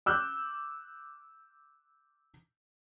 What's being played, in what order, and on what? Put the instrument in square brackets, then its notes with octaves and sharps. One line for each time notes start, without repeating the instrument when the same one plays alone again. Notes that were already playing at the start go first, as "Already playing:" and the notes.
[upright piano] D6 E6 F#6 G6